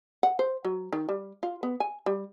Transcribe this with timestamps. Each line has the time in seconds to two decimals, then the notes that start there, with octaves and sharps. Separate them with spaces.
0.23 F#5
0.39 C5
0.65 F#3
0.93 D#3
1.09 G3
1.43 F4
1.63 B3
1.80 G#5
2.06 G3